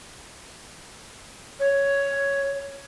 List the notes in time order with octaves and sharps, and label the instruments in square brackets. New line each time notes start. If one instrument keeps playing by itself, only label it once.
[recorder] C#5